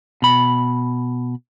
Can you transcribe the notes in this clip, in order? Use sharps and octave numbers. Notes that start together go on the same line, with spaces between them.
B2 B5